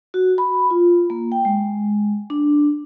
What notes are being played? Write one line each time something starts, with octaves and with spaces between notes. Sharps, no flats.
F#4
B5
F4
A#3
G5
G#3
D4